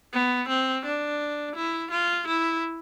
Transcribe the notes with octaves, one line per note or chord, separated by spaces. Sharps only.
B3
C4
D4
E4
F4
E4